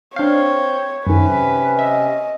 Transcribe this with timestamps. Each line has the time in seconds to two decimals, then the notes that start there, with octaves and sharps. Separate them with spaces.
0.16 C4 D4 C#5 F5 G6
1.07 F#2 C3 D#3 C#4 B4
1.79 D#5 E5